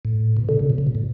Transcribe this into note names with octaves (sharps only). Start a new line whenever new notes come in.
A2
B2
B2 D3
C#3
B2
C#3
B2
A2